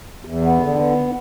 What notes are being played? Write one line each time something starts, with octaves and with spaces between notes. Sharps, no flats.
E2
B3
D3
B3